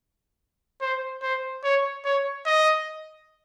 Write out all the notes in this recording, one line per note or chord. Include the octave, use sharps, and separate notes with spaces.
C5
C5
C#5
C#5
D#5